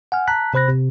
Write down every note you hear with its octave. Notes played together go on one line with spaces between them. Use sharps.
F#5 G#5 F6
A5 A#5 F#6 B6
C3 C5 B5 F#6 A#6
C3